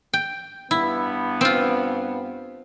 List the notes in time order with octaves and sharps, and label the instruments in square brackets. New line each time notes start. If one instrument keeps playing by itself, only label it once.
[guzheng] G5
[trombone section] G2 B3 [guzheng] E4
[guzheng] C4 F4